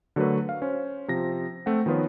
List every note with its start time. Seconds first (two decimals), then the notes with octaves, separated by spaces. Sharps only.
0.16 D3 F#3 A3 F#4 A#4 B4
0.49 F5
0.62 C#4 C5
1.08 C3 F3 A#6
1.66 A3 C4 F#5
1.86 D#3 F3 B3 F4 B4 C#5